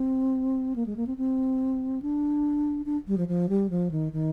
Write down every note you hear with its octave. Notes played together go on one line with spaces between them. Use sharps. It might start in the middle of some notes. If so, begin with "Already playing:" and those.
Already playing: C4
A#3
G#3
A#3
C4
C4
D4
D4
G3
F3
F3
G3
F3
D#3
D#3